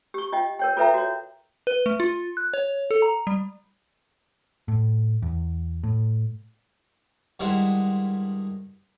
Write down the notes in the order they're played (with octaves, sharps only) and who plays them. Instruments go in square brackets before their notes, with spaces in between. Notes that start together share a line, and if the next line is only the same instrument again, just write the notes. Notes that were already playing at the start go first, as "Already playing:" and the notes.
[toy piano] G4 C#6
F4 D#5 G5
A#4 C#5 G5
F4 A4 B4 E5 G5 A#5
F#4 C#5
[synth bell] B4
A3
F4
F#6
C#5
A4
A#5
G3
[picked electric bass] A2
E2
A2
[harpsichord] G2 D#3 G#3 E4 C5 F#5